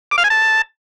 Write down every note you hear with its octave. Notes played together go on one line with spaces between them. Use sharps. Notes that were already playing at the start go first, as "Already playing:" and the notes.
D6
F5
G#5
A5